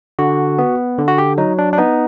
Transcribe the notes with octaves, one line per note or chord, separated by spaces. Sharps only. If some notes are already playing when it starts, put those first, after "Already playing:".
D3 F#4
B3
D3
F#4
G4
F#3 D#4
D4
D4
B3 D#4